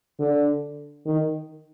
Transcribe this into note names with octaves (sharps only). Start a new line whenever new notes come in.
D3
D#3